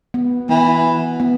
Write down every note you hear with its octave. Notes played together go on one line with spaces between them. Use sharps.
B3
E3 B3
B3